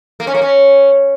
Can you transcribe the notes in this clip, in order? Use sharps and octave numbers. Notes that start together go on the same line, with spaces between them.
A#3
C#4
A#3
C#4